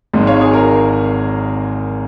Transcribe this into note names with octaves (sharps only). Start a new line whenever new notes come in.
G#1 G#2 G#3
C#5 F5
G#4 C#5
A#4